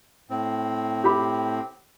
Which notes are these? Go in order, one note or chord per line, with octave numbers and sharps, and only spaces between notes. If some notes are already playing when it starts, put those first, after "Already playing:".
A2 C4
G4 B5